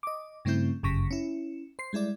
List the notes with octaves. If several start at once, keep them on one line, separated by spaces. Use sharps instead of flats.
D#5 D6
G2 C#3 A3 C4 E4 G6
G1 F#2 C#3 C#6 A#6 B6
C#4 E4
C5 C7
G3 G#3 E4 D5